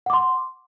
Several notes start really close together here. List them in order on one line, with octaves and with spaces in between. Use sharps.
F#5 D6 C6